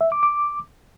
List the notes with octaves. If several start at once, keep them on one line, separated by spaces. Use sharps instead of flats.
E5
D6
D6